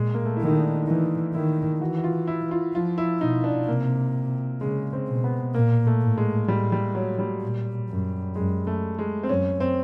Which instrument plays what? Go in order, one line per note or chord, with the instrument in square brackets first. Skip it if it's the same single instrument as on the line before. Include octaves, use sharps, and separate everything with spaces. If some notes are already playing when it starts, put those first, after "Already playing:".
Already playing: [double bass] A#2 [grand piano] G#3
[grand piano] A#3
A3
[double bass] D#3 [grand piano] E4
[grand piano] D#4
D4
[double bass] E3 [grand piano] D#4
[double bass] D#3 [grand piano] E4
[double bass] E3 [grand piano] F#4
[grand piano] F#4
F4
E4
F4
[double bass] F3 [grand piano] F4
[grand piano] E4
[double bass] B2 [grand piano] D#4
[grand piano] D4
[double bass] C3 [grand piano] A#3
[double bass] C#3 [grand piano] G#3
[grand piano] C4
[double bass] B2
[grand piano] B3
[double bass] A#2 [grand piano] A#3
[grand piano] A3
[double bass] A2
[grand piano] G#3
[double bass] A2 [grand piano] G3
[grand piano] G3
F#3
G3
[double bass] A#2
F#2
[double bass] F#2 [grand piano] G#3
[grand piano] A3
G#3
C4
[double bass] F#2 [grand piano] C#4
[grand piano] C4